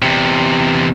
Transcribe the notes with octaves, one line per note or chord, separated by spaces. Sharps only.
E2 C3